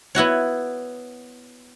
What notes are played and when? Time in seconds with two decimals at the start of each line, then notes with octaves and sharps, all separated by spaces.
0.15 B3 E4 F#4 C#5